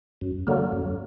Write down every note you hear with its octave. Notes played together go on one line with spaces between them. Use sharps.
F#2
D3 F#3 A#3
F#2